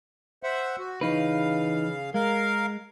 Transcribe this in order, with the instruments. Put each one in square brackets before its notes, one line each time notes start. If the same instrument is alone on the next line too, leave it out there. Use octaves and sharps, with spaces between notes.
[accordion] C5 E5 F#5
F#4
[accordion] C#3 F5 [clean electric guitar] E3 D#4 B4
[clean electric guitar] G#3 [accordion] A#4 F5